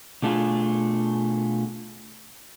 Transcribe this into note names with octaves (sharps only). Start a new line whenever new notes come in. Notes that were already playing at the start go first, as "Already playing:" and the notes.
B2 A3 D4 F4 G#4